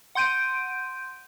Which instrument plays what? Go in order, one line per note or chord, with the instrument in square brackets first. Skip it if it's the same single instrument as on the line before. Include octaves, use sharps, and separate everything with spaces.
[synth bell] F#5 C6 G6 D7 D#7